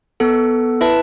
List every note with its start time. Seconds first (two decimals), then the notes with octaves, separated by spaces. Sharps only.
0.20 B3 A4 F#5
0.81 E4 B4 E5 A5